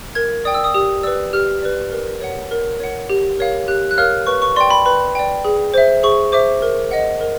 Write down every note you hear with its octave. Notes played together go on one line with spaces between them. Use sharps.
A#4 G#6
D5 G5 D#6
E6
D#6
G4 D#6
B4 D5 E6
G4 F6
B4 D5
A#4
C#5 F#5
A#4
C#5 F#5
G4
A#4 C#5 F5
G4 F#6
F#6
A#4 C#5 F5 F6
B4 C#6
C#6
D5 G5 C6
B5
B4 B5
D5 G5
G#4
C5 E5
G#4 C#6
C5 E5 D6
A#4
D#5 F#5
A#4